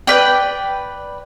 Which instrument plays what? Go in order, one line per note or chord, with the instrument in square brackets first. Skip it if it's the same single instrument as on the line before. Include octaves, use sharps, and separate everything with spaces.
[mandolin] B4 D5 G5